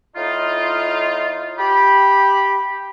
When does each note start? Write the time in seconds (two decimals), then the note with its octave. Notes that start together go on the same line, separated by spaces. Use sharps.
0.16 A2 D#4 F4
1.59 G4 B5